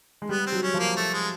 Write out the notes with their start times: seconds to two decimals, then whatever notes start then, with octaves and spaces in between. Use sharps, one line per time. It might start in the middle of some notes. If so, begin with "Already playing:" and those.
0.22 G#3
0.29 G3 B3
0.46 C4
0.52 F#3
0.63 C#4
0.74 F3
0.79 A#3
0.96 A3
1.13 G#3